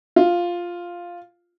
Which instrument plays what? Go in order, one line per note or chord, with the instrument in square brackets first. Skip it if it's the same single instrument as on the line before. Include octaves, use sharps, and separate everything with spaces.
[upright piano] F4